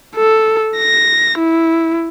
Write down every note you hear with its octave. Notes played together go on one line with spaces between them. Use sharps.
A4
A#6
E4